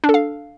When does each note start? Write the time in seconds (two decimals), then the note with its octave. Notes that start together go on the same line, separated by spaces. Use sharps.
0.04 D4
0.09 A4
0.14 F5